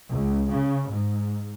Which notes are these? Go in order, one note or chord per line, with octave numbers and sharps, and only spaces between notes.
C#2
C#3
G#2